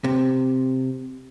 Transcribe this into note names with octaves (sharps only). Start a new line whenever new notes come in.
C3